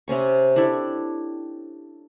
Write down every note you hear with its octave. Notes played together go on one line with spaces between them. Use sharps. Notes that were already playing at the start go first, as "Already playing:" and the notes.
C3 C4 C#4 C#6
D4 E4 G4 A4